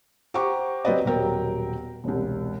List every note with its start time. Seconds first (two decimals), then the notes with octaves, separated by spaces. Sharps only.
0.34 G4 C5 F#5 A#5 C#6 D6
0.85 F#3 C4 G4 B4 D5 D#5
1.05 D#1 B2 F#3 A#4 G5
2.04 E1 C2